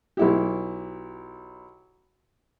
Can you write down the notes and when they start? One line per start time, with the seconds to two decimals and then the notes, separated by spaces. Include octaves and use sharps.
0.17 B1 E4 G4